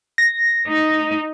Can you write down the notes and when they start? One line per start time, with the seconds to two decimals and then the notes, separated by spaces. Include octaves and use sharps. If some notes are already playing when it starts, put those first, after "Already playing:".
0.18 A#6
0.67 D#4